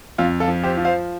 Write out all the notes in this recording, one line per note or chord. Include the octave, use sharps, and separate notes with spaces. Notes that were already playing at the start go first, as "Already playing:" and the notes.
F2 F4
F4 A4
F3
G4 C5
F3
C5 F5